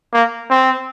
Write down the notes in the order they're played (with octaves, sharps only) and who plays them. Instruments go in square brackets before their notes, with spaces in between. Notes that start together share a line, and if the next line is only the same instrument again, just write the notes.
[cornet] A#3
C4